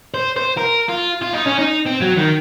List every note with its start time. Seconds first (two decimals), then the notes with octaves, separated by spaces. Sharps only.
0.14 C5
0.36 C5
0.57 A#4
0.89 F4
1.22 F4
1.34 D#4
1.47 C#4
1.59 D#4
1.86 C4
2.02 F#3
2.18 D#3